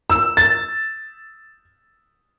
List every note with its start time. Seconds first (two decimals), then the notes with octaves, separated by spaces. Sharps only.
0.10 E6
0.37 A6